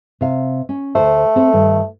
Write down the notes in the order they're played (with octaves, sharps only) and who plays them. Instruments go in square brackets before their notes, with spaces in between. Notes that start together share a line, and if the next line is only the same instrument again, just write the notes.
[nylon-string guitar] C3 F5
C#4
[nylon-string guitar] D2 B2 C5 [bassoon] A3
[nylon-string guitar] C4 A4
G2 D#3